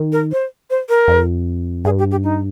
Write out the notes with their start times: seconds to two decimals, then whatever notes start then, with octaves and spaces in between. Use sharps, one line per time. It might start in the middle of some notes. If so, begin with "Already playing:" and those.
Already playing: D#3
0.12 A#4
0.32 C5
0.70 C5
0.89 A#4
1.08 F2
1.85 G2 G#4
1.99 G4
2.11 G4
2.24 D#4